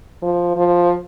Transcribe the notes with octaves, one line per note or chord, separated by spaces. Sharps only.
F3
F3